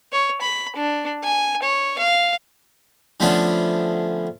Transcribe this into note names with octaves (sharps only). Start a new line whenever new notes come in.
C#5
B5
D4
G#5
C#5
F5
D3 F3 A3 B3 C#4 D4